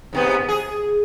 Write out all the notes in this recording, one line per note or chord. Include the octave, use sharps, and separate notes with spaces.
G#2 C3 B3
G#4